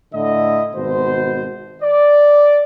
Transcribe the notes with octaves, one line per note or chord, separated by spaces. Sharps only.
A2 D3 E4 D#5
G#1 B2 C5
D5